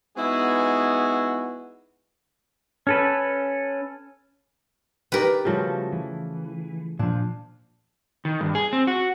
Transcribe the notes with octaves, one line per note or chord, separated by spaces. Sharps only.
G#3 B3 D#4 E4 F#4 G#4
C#4 A4 B4
D#3 G4 A#4 B4 D5
C#3 F3 G3 A3 F#4 G4
E3
A#2 F3 D4
D#3
G2
G#4
C4
F#4